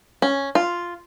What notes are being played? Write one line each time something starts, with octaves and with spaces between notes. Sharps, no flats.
C#4
F4